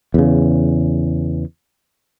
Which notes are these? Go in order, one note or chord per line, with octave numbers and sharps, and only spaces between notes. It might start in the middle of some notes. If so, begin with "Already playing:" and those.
E2 C#3